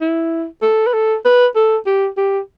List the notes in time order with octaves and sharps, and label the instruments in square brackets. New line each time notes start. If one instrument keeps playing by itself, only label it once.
[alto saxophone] E4
A4
B4
A4
B4
A4
G4
G4